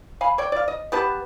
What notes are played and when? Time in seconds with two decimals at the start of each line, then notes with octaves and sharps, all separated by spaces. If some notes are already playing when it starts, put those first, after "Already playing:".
0.21 F5 G#5 B5
0.38 C#5 D5 G5
0.52 D5 F5
0.68 D#5
0.92 B3 G4 B4 A5